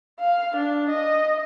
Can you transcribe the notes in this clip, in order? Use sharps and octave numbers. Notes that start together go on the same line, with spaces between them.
F5
D4
D#5